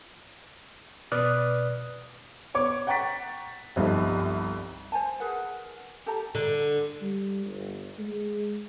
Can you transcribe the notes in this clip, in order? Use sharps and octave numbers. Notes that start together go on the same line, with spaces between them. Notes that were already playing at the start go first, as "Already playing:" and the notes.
B2 B4 D5 D#6 F6 F#6
B3 C#5 D6
F#5 G5 A#5 C#6 A6 B6
G1 C2 F3 D#4 E5
C5 G#5 A5
G#4 A#4 B4 F#5
G4 A4 A5 A#5
D3
G3
G1
G#3